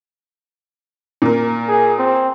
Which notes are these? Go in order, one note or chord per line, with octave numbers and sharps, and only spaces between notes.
A#2 A#4
G#4
C4